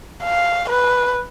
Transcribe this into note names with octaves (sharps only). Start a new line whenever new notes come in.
F5
B4